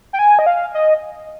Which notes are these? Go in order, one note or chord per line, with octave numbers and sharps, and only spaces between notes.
G5
G#5
D#5
F5
D#5